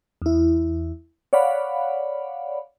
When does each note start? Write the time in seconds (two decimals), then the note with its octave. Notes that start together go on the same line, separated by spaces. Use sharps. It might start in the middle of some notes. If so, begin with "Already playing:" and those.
0.22 E2 E4
1.33 C#5 D5 F5 F#5 B5